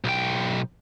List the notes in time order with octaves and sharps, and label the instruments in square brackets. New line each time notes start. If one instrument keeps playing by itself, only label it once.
[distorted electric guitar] B1 G5